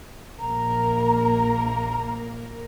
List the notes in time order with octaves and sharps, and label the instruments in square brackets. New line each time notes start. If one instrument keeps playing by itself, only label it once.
[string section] A#1 A#3 A#4 [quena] A#5